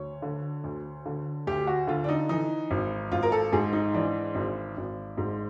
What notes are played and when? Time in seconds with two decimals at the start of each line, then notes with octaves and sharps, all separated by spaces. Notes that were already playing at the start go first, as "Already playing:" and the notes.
Already playing: D2 C#5
0.22 D3
0.64 D2
1.06 D3
1.47 D2 G4
1.67 F#4
1.87 D3 F4
2.04 D4
2.09 D#4
2.29 E3 D#4
2.71 G#1
3.12 G#1 F4
3.23 A#4
3.32 A4
3.52 G#2 G#4
3.73 D#4
3.94 E3 D4
4.35 G#1
4.77 G#1
5.17 G#2